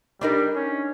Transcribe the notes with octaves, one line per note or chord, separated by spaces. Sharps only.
G3 D4 D#4 A#4
C#4